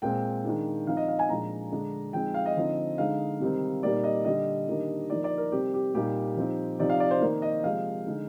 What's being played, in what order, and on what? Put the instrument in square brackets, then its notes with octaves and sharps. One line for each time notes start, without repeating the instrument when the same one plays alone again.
[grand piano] A#2 G#3 C4 G5
D#3 G#3 D4
F3 C4 D#4 F5
D#5
F5
G#5
A#2 F3 G#3 D4 A#5
D3 G#3 D4
F3 G#3 C4 D#4 G5
F5
D#5
D3 F3 C4 D#4
D3 G#3 D#4 F5
C3 D#3 G3 C4 D#4
A#2 G3 A#3 D#4 D5
D#5
D3 G3 D4 D#5
D#3 G3 A#3 D4
F3 A#3 D#4 D5
D5
A#4
C3 G3 C4 G4
G4
A#2 G3 A#3 D#4 G4
F3 C4 D#4
C3 F3 C4 D#4 D5
F5
D5
C5
D#3 A#3 D#4
D#5
C3 F3 G#3 F5
D3 G#3 D#4